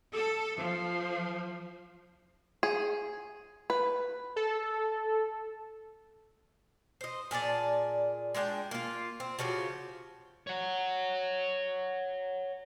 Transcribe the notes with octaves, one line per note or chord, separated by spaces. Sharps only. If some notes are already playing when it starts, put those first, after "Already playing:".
A4
F3
G#4
B4
A4
C5 D#5
A#2 G#4 D5 A5
G#3 D4 F5 G5
A#3 F4
C4
C#3 F3 F#4 G4
C#5 F#5